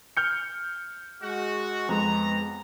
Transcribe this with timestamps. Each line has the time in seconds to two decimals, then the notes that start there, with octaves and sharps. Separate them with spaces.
0.17 F6 G6 C#7
1.22 G#3 F#4
1.89 F2 G#3 B3 A#5